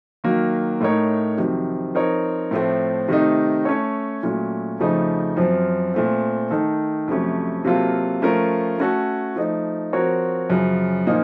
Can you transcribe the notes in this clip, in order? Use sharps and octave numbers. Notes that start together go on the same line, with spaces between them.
D#3 F#3 A#3
A2 A3 D#4 A#4 C#5
F2 C3 D#3 F#3
F3 C4 D#4 A#4 C#5
A2 F3 A3 C4
C3 D#3 A3 D#4
A3 C#4 A4 C#5
A#2 F#3 A3 C#4
F2 C#3 F3 A3 D#4
F#2 F3 C4
A#2 A3 C4
D#3 A3 D#4 A4
F2 C3 F#3 A3 C#4
C3 F#3 A#3 F4 A4
F3 A3 C#4 F4 A#4
A3 C#4 F#4 A4
F3 A3 D#4
F3 C4 F#4 A#4 C#5
F#2 C#3 F3
A#2 F3 A#3 D#4